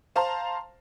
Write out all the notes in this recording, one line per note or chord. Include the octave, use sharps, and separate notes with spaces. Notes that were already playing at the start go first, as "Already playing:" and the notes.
C5 F5 A5 A#5 C6